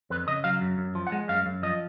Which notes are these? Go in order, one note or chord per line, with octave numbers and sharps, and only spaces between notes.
F2 B4
C#3 D#5
F#3 F5
F#2
F#2
F3
F#5
G#3
F#2 F5
F#2
F3 D#5